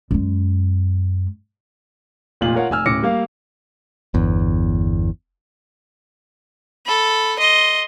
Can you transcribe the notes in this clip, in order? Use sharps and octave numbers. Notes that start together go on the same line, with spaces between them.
F#2 G#3
F1 A#2 F4 F#7
F4 A#4 C#5 F5 F#5
F1 G#5 E6 F6
D1 C#4 D6 A#6 C#7
G3 A#3 F5
G1 E2
A4 B5
D#5 C6